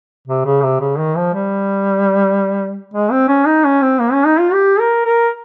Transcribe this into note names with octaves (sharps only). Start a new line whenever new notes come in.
C3
C#3
C3
C#3
D#3
F3
G3
G#3
C4
C#4
D#4
C#4
C4
A#3
C#4
D#4
F4
G4
A#4
A#4